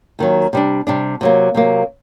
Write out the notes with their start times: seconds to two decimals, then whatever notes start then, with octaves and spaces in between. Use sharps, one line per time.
0.19 D#2 D#3 F#3
0.53 C3 G3 D4
0.87 C3 G3 D4
1.21 C3 F#3 A#3
1.55 C3 F#3 A#3